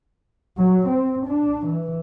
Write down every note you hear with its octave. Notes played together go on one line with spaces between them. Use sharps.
F#3
C4
D4
E3